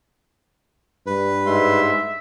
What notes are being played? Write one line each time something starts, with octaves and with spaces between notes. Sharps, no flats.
G2 B4
G#2 G#3 E5 C6